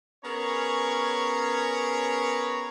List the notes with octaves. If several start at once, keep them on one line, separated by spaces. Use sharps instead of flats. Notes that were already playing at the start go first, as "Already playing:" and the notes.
B3 C#4 G#4 A#4 C#5 A#5